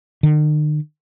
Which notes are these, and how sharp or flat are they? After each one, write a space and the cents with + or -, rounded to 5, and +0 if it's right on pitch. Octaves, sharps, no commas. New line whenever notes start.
D#3 -45